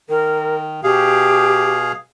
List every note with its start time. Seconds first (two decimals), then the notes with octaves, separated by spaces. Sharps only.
0.10 D#3 A#4
0.83 B2 G4 G#4 F5